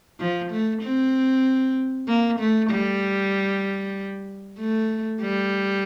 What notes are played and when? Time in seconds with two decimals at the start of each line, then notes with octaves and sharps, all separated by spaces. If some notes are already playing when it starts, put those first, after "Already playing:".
0.20 F3
0.51 A3
0.83 C4
2.08 A#3
2.40 A3
2.71 G3
4.59 A3
5.22 G3